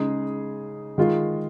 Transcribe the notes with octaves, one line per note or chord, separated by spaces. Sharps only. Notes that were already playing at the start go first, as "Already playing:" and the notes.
Already playing: C#3 G#3 D#4 G#4
D#3 G#3 F4